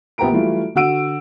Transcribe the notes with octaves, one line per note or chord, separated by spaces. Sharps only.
A#1 B3 G4 A#4 A#5 D7
E3 F#3 G3 A3 F4
D3 F#4 F#5 E6 D7 D#7